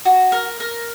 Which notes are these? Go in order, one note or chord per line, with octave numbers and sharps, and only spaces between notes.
F#4
A#4
A#4